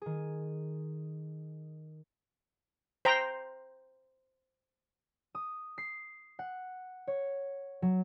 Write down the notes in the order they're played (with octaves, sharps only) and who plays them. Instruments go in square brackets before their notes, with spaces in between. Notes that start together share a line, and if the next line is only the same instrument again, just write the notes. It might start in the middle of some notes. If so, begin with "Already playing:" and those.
[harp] D#3 G#4
[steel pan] C5 G5 A#5
[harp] D#6
C7
F#5
C#5
F#3